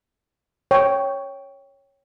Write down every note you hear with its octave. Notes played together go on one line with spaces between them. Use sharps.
C#5 G5